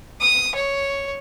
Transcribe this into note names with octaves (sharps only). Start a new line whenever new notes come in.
D#6
C#5